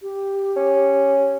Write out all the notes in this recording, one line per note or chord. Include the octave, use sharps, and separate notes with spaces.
G4
C#4